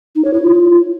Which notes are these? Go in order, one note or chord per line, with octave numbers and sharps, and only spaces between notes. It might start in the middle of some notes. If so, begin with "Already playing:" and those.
D#4
C#5
E4
F4